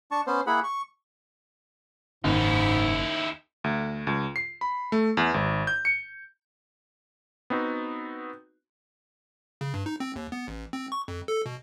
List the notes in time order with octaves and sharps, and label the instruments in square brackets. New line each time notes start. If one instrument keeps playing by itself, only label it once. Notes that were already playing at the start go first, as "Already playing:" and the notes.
[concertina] D4 A5 C#6
B3 C#4 C5
A#3 E4 G#4 F#5 B5
C#6
[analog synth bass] F#1 [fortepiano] D#2 [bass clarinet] G#2 [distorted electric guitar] D#4 E4
[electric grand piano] D2
C#2
C7
B5
A3
E2
G#1
G6
C#7
B3 C4 D#4 F#4
[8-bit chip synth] C#3
G2
D#4
C4
D#2
B3
A1
C4
C#6
F2
A4
B2